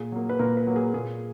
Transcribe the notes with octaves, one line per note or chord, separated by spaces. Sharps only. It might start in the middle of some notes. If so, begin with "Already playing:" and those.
Already playing: A#2 G#4
F#3 A#3
B4
A#2 A#4
B4
F#3 A#3
G#4
A#2 G#4